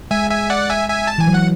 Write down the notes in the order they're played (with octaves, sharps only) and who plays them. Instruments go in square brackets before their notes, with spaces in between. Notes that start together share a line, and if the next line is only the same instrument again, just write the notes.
[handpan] G#3 [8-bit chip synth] E5 G#5
[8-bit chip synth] E5 G#5
D5 F#5
E5 G#5
E5 G#5
A5
[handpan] E3 [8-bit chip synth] G#5
[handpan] F#3
[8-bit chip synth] F#5